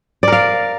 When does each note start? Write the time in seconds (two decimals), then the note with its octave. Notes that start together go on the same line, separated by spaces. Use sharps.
0.23 D5
0.28 A#4
0.32 F5